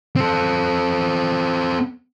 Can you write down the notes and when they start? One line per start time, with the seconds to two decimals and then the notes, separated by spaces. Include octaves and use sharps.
0.16 C4 A4